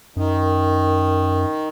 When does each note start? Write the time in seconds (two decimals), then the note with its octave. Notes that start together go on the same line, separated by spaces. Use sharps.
0.16 F#2 D#3